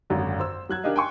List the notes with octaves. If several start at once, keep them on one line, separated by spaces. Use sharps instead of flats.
G#1 F#2 D3
C5 E6
F#3 F#6 G#6
D4 G4 A#4 D#5 F5
G5 G#5 C6 C#6